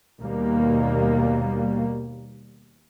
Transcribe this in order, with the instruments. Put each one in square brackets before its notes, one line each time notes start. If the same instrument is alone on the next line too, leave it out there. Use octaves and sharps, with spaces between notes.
[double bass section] D#2 B2 G3 A#3